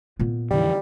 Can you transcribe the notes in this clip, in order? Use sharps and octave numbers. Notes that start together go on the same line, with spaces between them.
A#2 B3
F2 D3 E3 G3